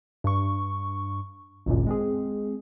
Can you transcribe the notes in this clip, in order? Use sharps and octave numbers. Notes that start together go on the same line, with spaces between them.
G2 C#6
G#1 C#2 F#2 A#2
G#3 C4 G#4